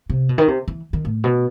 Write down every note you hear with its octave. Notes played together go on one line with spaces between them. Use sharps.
C3
B2
D#3
C3
E3
D#3
A2
B2